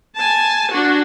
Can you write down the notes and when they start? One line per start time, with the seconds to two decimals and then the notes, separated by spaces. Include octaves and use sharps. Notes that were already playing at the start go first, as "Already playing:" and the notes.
0.16 G#5 A5
0.71 D4 F#4